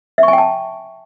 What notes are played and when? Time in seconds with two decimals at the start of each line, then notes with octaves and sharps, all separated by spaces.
0.18 E5
0.23 C#6
0.28 G#5
0.33 G5
0.38 A5